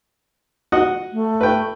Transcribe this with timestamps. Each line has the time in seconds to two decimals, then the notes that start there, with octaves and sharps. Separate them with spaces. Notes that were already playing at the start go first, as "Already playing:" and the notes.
0.72 F#4 D#5 F#5
1.12 A3
1.41 B4 G5